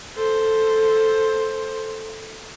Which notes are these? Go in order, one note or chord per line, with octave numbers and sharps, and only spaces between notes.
A4 C5